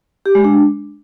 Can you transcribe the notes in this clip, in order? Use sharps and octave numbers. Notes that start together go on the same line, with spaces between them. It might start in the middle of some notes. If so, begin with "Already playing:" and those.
G4
G#3
D4